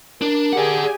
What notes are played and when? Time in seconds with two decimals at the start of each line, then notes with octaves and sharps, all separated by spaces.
0.22 D4 A#4
0.53 G4 G#4 D5 F#5 G#5